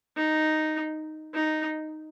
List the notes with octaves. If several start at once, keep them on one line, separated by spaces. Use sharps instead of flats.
D#4
D#4